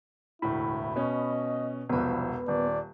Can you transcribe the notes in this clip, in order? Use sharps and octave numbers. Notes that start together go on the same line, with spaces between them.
E1 D2 A2 E4 B5
B2 C#4 D#5
E1 C2 F3 B3 B4
D#1 D5